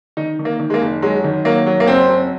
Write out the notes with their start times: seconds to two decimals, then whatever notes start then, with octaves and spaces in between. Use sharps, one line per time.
0.17 D#3 D#4
0.39 D#3
0.45 A#3
0.60 D#3
0.70 G#3
0.74 A#3
0.82 F#1
1.02 F#3 G#3
1.24 D#3
1.45 F#3 A#3
1.66 F#3
1.80 A#3
1.87 F#1 C4
2.09 F#3